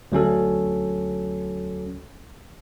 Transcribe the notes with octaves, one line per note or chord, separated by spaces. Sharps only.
D2 F#3 C#4 A4